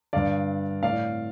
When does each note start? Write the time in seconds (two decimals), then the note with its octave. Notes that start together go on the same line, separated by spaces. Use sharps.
0.13 G2 D3 D5 F5
0.83 A2 D5 F5